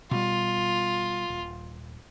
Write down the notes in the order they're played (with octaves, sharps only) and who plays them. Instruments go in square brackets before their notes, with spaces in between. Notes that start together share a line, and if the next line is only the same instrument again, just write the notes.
[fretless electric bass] B2 G3 [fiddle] F4
[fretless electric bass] D#1